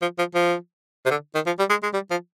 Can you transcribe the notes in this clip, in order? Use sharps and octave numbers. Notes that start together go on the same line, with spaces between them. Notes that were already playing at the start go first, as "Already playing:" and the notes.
F3
F3
F3
C3
D3
D#3
F3
G3
G#3
G#3
G3
F3